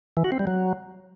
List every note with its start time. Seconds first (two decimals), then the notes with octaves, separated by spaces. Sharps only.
0.17 E3
0.24 F#4
0.32 C4
0.39 G3
0.47 F#3